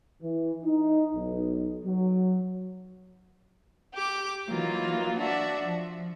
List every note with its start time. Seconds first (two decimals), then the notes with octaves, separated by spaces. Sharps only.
0.22 E3
0.65 D#4
1.14 B1
1.85 F#3
3.93 G4 D6
4.48 E3 F#3 A#3 D#4 F4
5.17 D4 F#4 D5 E5
5.61 F3